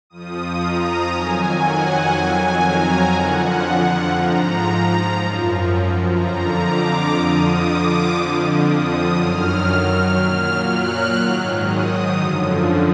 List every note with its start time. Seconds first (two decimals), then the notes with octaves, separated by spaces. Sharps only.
0.10 F2 F3 D#6
0.60 A#5
1.11 F2 D#3 F#3 G#5
1.61 F#5
2.11 F2 D#3 F#3 G#5
2.61 A#5
3.11 F2 D3 F3 F#5
4.12 G#2 F3 A#5
5.13 F#2 F3
6.13 F2 D3 F3 A#5
6.64 D6
7.14 F2 D3 F3 D#6
7.65 D6
8.15 F2 D3 F3
8.65 D#6
9.16 F#2 D#3 F#3 F6
10.16 A#2 F#3 F6
10.67 F#6
11.17 G#2 D#3 F#3
11.67 D#6
12.17 F#2 D3 F3